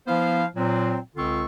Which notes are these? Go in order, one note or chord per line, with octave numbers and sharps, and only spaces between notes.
F3 B3 E4 C5 F5
A#2 F#3 C4
C#2 D3 C4 F4 C#6 E6